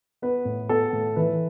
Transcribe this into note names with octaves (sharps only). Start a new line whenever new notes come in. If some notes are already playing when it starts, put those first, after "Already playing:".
B3 B4
A2
B3 A4
A2
E3 B4